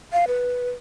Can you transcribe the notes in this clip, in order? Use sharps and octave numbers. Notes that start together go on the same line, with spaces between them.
F5
B4